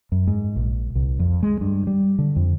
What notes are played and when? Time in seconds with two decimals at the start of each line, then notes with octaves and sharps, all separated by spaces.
0.12 F#2
0.27 G#2
0.56 A#1
0.95 C2
1.19 F2
1.43 G#3
1.61 G2
1.87 G3
2.19 D3
2.36 F2